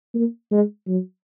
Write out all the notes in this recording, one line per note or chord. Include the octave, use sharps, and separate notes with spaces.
A#3
G#3
F#3